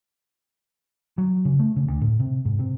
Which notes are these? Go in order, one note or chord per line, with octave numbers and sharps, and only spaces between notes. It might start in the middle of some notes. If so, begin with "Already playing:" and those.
F#3
C#3
A3
C#3
D2
A2
C3
G#2
C3